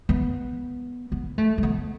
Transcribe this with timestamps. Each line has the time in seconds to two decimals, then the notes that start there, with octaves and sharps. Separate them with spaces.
0.09 B3
1.12 B3
1.38 A3
1.58 A3
1.63 B3